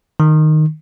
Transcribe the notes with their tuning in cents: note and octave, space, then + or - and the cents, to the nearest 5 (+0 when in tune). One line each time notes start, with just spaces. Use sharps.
D#3 -10